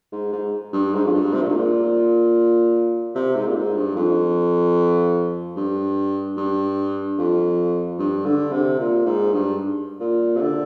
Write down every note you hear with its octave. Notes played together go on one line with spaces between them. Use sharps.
G#2
G#2
G2
G#2
F2
G2
C3
A#2
G#2
A#2
C3
G#2
A#2
G#2
G2
F2
G2
G2
F2
G2
D3
C3
A#2
G#2
G2
A#2
C3
D3